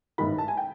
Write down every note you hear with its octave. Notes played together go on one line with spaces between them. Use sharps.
A1 G#2 D#3 B5
A5
G#5
G5